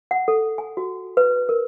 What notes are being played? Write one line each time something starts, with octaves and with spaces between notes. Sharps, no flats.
F#5
A4
G#5
F#4
B4
A#4